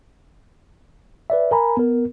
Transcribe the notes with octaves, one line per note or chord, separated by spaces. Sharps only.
B4 D5 E5
A#4 G#5 A#5 B5
B3 A#4